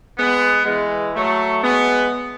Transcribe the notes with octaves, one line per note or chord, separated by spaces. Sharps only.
G#3 B3
E3 G#3
F#3 A3
G#3 B3